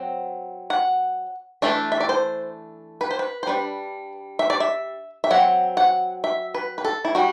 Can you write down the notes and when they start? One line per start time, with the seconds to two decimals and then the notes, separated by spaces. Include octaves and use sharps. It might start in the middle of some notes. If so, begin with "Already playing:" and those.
Already playing: F#3 C4
0.70 F#5
1.62 E3 A3 D4 E5
1.92 E5
2.00 D5
2.09 C5
3.01 B4
3.11 C5
3.19 B4
3.43 C5
3.47 G3 D4 B4
4.39 E5
4.50 D5
4.60 E5
5.24 E5
5.31 F#3 C4 F#5
5.77 F#5
6.24 E5
6.54 B4
6.78 B4
6.84 A4
7.05 E4
7.15 G3 F#4